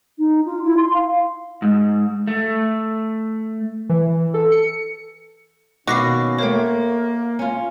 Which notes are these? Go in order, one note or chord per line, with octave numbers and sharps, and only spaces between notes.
D#4
F4
E4
C6
F5
G#2
A3
E3
A4
C#7
B2 D#3 A#3 C#4 F#4 D6 A#6 C7
A3 A#3 C5 C#5 G5
C#4 F4